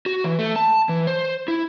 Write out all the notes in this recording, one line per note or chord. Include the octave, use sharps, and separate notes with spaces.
F#4
E3
A3
A5
E3
C5
E4